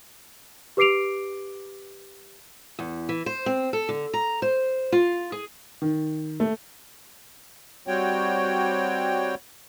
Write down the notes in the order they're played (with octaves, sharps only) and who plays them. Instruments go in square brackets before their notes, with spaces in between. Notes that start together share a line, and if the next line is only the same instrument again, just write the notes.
[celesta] G4 B4 D6 C7 D7 F7
[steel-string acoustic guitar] E2
E3
C5
C4
A4
D3
A#5
C5
F4
G#4
[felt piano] D#3
A3
[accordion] G3 C4 F#4 C#5 G5